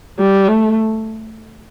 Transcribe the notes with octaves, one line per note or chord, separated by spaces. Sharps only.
G3
A3